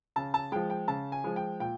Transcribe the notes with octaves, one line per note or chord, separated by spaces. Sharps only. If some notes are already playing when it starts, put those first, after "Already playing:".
C#3 A5
A5
F3 G#3 G5
G5
C#3 A5
G#5
F3 G#3
G5
A#2 G5